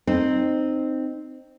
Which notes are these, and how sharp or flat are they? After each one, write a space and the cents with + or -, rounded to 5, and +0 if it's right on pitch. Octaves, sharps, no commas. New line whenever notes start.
C4 +0 D#4 -20